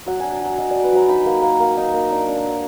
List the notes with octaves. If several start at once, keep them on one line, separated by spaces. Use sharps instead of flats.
F#3 F#5
D4 G#5
A#5
F#3 G#5
F#3 D#5
D4 D5
B4
F#3 A#5
D#4 B5
A#3
A#3
A#3
D#4
A#3
D4 D6
D4
D6
F#3